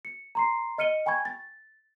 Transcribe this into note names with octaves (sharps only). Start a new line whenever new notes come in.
C#7
A#5 C6 C7
D#5 F6 C#7 D#7 G7
G5 G#5 B5 C#6 G#6
A6